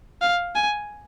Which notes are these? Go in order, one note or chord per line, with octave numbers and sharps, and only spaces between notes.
F5
G#5